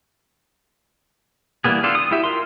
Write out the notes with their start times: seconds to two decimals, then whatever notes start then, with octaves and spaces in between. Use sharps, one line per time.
1.64 E3 G3 A#3 B3 G#4
1.83 D4 F4 G4 A4
1.95 D#6
2.11 E4 F#4 G4 E5
2.24 F4 A#4 C6